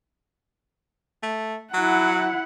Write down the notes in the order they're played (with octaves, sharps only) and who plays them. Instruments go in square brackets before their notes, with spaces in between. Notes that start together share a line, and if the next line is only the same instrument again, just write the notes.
[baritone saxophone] A3
[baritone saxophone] F#3 [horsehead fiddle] E4 F#5